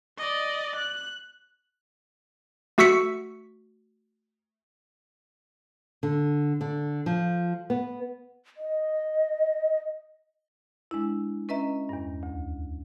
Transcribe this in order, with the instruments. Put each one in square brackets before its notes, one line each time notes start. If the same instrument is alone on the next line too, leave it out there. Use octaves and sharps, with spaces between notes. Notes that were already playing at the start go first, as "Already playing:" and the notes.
[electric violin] D5 D#5
F#6
[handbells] A3 F#4 C#6 E6 B6 C#7
[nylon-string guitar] D3
D3
F3
B3
[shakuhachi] D#5
[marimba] G#3 D4 E4
C#4 B4 D#5 E5 A#5
E2 G2
D2